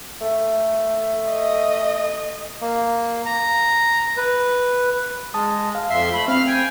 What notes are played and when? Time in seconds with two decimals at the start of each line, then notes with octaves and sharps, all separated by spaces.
0.21 A3
1.29 D#5
2.61 A#3
3.26 A#5
4.17 B4
5.34 G#3 A5 D#6
5.75 F5
5.90 F2 E5 C6
6.14 A3 B5
6.28 C4 F5 F6
6.47 G5 G#5